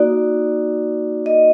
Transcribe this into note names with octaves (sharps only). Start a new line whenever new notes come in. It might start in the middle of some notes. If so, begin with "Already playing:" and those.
Already playing: A#3 D#4 F#4 D5
D#5